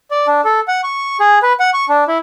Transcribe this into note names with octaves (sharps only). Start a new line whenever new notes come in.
D5
D4
A4
F#5
C#6
G#4
B4
F#5
C#6
D4
E4